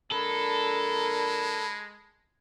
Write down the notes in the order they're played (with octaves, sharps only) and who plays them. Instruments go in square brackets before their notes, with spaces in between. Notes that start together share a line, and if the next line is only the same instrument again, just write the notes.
[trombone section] A#1 D4 A#4 [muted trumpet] G#3 [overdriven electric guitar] A4 [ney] B5